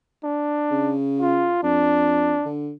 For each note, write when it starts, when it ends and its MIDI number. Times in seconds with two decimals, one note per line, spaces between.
0.24 0.94 62
0.71 1.52 49
1.20 1.59 65
1.63 2.35 41
1.63 2.50 62
2.45 2.72 50